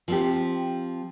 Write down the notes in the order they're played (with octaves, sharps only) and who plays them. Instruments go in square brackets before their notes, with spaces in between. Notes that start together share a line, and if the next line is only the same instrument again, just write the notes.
[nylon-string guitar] F3 C4 G4